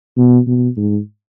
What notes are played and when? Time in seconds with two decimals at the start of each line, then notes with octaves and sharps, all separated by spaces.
0.17 B2
0.47 B2
0.77 G#2